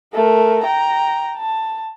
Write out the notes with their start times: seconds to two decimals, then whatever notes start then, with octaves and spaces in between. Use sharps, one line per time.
0.13 A3 A#4
0.64 G5 A#5
1.37 A5